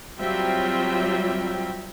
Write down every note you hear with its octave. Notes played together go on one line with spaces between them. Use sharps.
F#3 G3 C4 F4 E5 G5